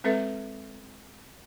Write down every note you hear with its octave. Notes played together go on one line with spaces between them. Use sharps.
G#3 C4 A4 B4 E5